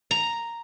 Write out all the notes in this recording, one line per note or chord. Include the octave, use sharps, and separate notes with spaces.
A#5